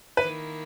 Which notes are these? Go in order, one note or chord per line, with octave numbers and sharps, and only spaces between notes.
D#3 A#3 E4 B4